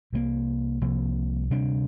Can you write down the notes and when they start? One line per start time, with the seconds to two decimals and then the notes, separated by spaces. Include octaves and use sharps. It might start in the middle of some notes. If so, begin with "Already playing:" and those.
0.13 C2 C3 F3 A#3
0.81 C2 C3 F3 A#3
1.51 D2 C3 G3 D4